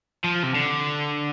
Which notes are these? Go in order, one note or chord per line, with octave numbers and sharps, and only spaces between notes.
F3
C3
D3